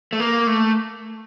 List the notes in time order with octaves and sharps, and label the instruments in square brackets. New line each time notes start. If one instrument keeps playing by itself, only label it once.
[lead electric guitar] A3
A#3
A3